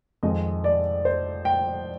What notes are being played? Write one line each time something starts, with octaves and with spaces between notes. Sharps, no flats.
F2 D#3 G#3 D#4 D#5
D5
C5
G5